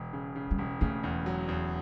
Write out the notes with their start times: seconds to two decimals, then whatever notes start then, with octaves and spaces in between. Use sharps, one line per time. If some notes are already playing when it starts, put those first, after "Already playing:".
Already playing: E1
0.13 C#3
0.36 C#3
0.51 G3
0.58 E1
0.81 C#3 A3
1.04 E2
1.26 F#3
1.48 E2